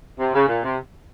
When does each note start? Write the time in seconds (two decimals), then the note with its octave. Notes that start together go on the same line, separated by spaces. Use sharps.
0.19 C3
0.35 C#3
0.48 A#2
0.64 C3